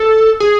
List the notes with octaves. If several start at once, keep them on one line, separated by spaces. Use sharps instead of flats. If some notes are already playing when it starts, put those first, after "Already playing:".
Already playing: A4
G#4